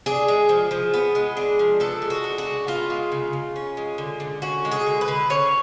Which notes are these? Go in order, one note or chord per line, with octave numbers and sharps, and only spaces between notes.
D4 G#4
G#3
F3
F3
B3
G#3
D4
F3
B3 A4
G#3
F#4
D4
F#4
C#3
B3 F4
G#3
C#3
C#3
C#4
G#3
D3
D3
C#4 F#4
G#3
G#4
D3
B4
D3
C#4 C#5